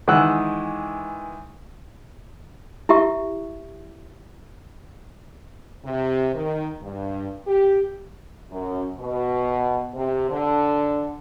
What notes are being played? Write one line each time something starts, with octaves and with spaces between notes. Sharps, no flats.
D#3 E3 G#3 F#5 E6 F#6
E4 G4 E5 C#6
C3
D#3
G2
G4
F#2
B2
C3
D3